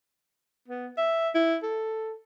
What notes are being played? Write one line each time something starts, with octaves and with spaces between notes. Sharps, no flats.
B3
E5
E4
A4